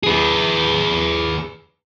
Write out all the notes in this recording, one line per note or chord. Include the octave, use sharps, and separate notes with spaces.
G#4 B4